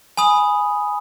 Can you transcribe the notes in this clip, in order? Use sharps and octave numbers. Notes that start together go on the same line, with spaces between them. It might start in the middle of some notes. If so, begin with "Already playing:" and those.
G#5 B5 D#6